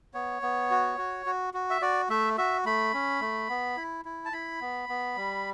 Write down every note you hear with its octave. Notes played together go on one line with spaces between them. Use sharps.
B3 C#5
B3
F#4
F#4
F#4
F#4
E5
F#4 D5
A3 E5
F#4 E5
A3 B5
C#4
A3
B3
E4
E4
A5
E4 B5
B3
B3
G3